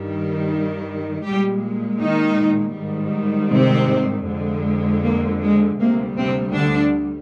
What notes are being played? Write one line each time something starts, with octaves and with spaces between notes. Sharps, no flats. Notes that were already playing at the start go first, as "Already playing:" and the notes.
Already playing: G2 D#3 G3
A#2 G3 G#3 G4
D#3 D#4
G#2 D#3 G3
C3 C4
F2 D3 G#3
A#3
G#3
D2 C3 G3 A#3
C3 C4
D3 D4